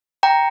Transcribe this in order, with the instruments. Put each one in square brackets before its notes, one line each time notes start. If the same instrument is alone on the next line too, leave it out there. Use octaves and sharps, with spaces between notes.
[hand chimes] G5 A#5